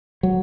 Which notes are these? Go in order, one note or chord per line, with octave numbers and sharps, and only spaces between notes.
F#3